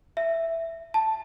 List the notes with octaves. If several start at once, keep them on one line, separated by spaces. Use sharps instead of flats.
E5
A5